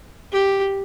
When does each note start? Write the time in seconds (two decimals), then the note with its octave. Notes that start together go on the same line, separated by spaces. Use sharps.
0.32 G4